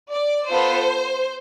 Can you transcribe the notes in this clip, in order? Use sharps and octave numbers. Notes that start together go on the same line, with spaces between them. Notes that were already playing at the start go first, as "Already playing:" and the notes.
D5
B3 F4 A4 C5